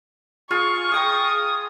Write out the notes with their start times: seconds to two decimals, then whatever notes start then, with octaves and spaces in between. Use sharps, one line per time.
0.51 F4 G#4 F5 C#6
0.92 G#4 G5 A#5 D#6